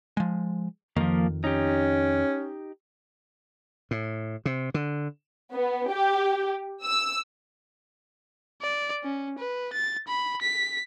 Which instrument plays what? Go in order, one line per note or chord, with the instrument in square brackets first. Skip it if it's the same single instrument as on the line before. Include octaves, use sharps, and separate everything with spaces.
[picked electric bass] F3 G#3
[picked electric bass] F2 D#3 [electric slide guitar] F3 A#3
[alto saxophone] C#4 [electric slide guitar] D#4 G4
[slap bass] A2
C3
D3
[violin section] B3
G4
E6
[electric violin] D5
C#4
B4
A6
B5
B6